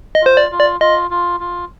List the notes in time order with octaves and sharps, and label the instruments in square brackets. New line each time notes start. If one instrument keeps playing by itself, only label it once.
[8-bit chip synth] D#5
[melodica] F4 [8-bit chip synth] C5
[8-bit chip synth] D5
[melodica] F4
[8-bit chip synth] D5
[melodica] F4 [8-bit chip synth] D#5
[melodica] F4
F4